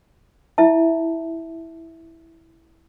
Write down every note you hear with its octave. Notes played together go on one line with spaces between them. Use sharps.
E4 E5 A5